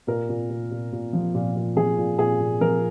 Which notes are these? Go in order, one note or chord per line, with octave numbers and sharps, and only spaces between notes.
A#2 A#4
A#2
A#2
A#2
A#2
F3
A#2
A#2
F3 G#4
A#2
A#2 G#4
A#2
F3 A#4